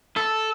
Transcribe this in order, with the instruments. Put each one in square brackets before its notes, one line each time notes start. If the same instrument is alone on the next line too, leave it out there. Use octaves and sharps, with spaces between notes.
[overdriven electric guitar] A4